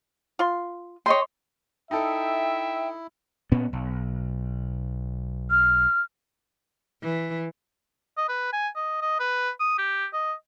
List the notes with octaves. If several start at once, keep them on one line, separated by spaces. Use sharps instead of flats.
F4 C6
C#5 D#5 G5 C6
D#4 E4 A4 E5 G5
A#2 B3 C#4
B1
F6
E3
D#5
B4
G#5
D#5
D#5
B4
D#6
G4
D#5